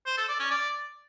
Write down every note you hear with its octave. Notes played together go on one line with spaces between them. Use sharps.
C5
A4
D5
C#4
D5